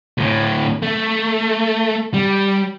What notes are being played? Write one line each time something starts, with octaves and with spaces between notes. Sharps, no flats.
D2 A2
A3
G3